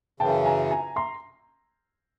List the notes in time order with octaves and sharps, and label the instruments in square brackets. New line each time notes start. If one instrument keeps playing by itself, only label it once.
[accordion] F#2 C#3 E3 [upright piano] G5 A5
[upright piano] G#5 A#5
G#5 A#5
A#5 C6